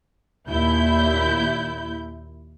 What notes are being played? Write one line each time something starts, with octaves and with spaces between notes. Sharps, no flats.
D#2 A#2 E4 G6